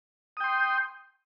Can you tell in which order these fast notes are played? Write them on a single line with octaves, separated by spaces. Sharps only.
D#6 G5 C6